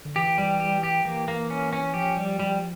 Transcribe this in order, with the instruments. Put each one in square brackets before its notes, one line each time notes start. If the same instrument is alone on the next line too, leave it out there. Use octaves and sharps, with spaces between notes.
[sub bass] D3
[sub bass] E3 [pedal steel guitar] G4
[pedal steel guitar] G3
G4
G4
[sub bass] E3 [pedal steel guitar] A#3
[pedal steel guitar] A#3
C#4
C#4
[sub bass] F3 [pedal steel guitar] G4
[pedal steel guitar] G3
G3